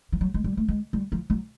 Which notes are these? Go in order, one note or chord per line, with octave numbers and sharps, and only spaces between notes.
F3
F#3
G#3
G3
A3
G#3
G3
F3
F#3